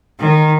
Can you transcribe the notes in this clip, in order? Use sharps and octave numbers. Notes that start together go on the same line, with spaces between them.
D#3